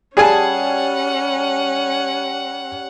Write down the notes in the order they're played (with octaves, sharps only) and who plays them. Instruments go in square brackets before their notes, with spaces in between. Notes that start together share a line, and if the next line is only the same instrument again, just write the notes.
[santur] G3 A5 [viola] C#4 [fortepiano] G#4 G#5 [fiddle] F#5